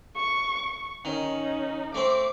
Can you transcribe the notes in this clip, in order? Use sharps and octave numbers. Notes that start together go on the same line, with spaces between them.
C#6
D#3 C#4 D#4
A3 C4 D6